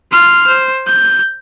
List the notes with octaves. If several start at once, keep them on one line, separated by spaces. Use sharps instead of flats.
C6 F6
C5
G6